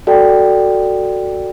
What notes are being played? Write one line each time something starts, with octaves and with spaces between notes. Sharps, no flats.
F#4 A4 D5 G5